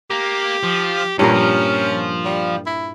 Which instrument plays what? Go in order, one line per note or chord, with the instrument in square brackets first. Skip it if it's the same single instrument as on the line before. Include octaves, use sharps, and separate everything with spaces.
[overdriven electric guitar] A#3 [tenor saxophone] G4
[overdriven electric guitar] F3
[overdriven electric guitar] E2 [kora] G2 A#2 A#4 [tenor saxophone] C#4
[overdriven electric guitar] F3
[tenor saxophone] G3
E4